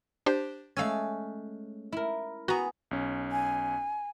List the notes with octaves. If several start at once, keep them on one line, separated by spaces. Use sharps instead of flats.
D4 G4 C5
G#3 A3 C#4 F5 E6 G#6
E4 A#4
B3 F#4 G#4 A#5
B1 C#4
G#5